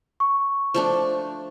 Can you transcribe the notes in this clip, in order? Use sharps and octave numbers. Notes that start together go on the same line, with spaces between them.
C#6
F3 A3 D4